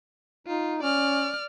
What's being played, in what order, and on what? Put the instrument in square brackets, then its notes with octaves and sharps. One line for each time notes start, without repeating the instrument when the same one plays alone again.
[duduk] D#4 [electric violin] F4
[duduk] C#4 [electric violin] D5 F6